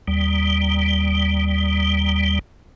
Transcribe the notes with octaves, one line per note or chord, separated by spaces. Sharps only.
D#2 G3